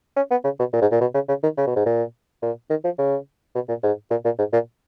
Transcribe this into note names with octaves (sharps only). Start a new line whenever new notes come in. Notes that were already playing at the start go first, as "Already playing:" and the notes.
C#4
B3
C#3
B2
A#2
G#2
A#2
B2
C#3
C#3
D#3
C#3
B2
G#2
A#2
A#2
D#3
F3
C#3
B2
A#2
G#2
A#2
A#2
G#2
A#2